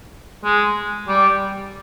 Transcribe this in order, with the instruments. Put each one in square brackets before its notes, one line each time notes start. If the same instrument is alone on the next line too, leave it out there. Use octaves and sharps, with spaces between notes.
[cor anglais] G#3
G3